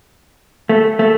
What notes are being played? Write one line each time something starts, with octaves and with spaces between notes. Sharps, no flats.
A3
A3